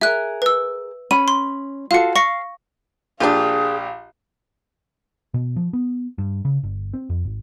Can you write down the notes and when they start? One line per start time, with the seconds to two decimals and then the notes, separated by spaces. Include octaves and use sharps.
0.01 G#4 A#4 E5 F#6
0.42 B4 E6
1.11 C#4 B5 D#7
1.28 C6
1.91 F4 F#4 A4 F5 C#7
2.16 F5 C#6 A#6 C#7
3.20 A#1 D4 F4 G4 G#4 F5
5.34 B2
5.56 F3
5.73 B3
6.18 G2
6.45 C#3
6.63 G1
6.94 C4
7.09 F2
7.25 G#1